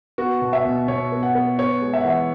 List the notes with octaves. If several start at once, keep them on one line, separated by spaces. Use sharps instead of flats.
B3 F#4
B2
E5
B2
B2 C#5
B3
F#5
B3
B3 C#5
G#3
E5
F#5
E3 E5